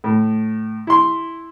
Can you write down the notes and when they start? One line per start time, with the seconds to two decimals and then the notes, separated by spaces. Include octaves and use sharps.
0.04 A2
0.87 E4 C6